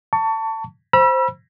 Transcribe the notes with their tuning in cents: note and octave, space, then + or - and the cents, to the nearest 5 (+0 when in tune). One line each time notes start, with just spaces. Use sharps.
A5 +20 C#6 +25
C5 +0 B5 -35 E6 +30